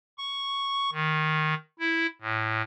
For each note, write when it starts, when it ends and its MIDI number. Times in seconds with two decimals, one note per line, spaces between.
0.18 0.90 85
0.93 1.54 51
1.79 2.06 64
2.22 2.62 45